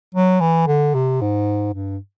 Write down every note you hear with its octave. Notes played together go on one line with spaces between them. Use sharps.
F#3
E3
D3
C3
G#2
G2